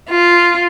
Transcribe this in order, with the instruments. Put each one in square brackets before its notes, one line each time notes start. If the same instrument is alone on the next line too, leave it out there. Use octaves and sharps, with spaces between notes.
[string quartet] F4